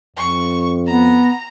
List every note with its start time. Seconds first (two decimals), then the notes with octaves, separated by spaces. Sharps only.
0.17 F2 C#6
0.87 B3 A#5